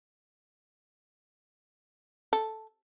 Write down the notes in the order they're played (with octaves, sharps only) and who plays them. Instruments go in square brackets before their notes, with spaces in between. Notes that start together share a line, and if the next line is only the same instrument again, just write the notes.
[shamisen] A4